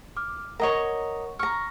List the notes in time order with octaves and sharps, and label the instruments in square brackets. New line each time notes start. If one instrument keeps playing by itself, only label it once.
[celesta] D6 F6
[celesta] A#4 F#5 [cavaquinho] C#5 D#5 A#5
[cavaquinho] A#5 C#6 [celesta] F6